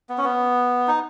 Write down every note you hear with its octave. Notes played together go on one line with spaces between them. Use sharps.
B3
C#4
B3
D#4